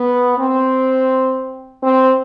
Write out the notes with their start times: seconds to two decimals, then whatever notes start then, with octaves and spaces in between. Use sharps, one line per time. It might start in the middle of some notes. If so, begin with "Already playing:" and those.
Already playing: B3
0.37 C4
1.82 C4